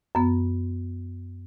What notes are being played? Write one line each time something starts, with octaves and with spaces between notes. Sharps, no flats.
F#2 B3